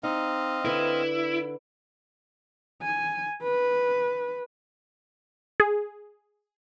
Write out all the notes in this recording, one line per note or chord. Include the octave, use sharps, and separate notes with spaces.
C4 D#4 D#5 F5
D3 E4 B4
G#5
B4
G#4